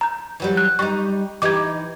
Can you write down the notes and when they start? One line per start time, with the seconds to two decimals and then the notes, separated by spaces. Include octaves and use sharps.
0.01 A#5 G6
0.40 E3 F#3 G3
0.57 F#6
0.79 G3 D#4 C#6
1.42 E3 D#4 G4 D6 G#6